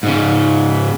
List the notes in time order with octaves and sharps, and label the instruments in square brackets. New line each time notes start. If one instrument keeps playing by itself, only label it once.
[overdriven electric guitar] G#2 C#3